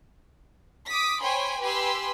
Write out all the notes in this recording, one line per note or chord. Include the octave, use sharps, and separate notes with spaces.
D6 D#6 B6
C5 C#5 G5 G#5 B5 C6
G4 B4 G#5 B5 C6 E6